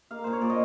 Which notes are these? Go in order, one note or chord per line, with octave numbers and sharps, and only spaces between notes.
A#3 F5
A#2 C5
C#5
A#2 D5
D#5